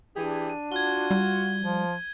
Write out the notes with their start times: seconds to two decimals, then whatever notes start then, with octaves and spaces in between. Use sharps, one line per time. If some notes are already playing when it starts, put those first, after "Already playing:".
0.16 E3 D4 G4 G#4
0.50 D#7
0.72 F4 F#4 G#6 G7
1.11 G3
1.62 F3